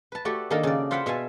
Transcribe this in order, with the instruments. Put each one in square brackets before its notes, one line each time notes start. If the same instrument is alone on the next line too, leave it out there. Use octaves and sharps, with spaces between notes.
[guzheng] B4 A5
A3 F#4 G4 A4 D5
D#3 A#3 D4 D#4 A4 A#4
C#3 D5
F4 C5 E5 F#5 G5 B5
B2 E5 F5 G#5 A5